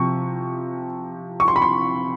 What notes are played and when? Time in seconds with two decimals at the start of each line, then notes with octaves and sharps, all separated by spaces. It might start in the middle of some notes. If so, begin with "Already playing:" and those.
Already playing: C3 F3 C#6
1.40 C#6
1.48 C6
1.56 B5
1.62 C6